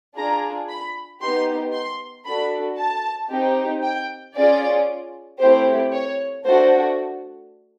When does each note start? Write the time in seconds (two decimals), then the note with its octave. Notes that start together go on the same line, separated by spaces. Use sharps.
0.16 D4 F4 G#4 A#5
0.69 B5
1.21 B3 D#4 G4 C6
1.73 C6
2.25 D4 F#4 A4 B5
2.78 A5
3.30 C4 D#4 G4
3.83 G5
4.35 C#4 F4 G#4 D5
5.39 A3 C4 E4 G4 C5
5.92 C#5
6.44 A3 D4 F#4 A4 C5